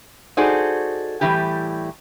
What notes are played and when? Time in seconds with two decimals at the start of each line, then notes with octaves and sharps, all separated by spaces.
0.37 D#4 F#4 G#4 A4 C5 D5
1.21 A2 E3 G3 G4